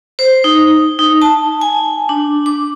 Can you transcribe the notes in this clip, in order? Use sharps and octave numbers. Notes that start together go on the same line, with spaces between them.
C5
D#4
D#4
A5
G#5
D4
D6